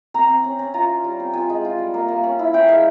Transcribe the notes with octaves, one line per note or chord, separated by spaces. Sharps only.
C4 A#5
C4
C#4
C#4
F4 A#5
F4
G3
C4
F4 G#5
G#3
F4
G3
A#3
A#3
C#4
E4
C#4 G5
G#3 F5